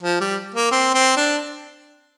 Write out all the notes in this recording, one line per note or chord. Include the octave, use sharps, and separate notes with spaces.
F3
G3
A#3
C4
C4
D4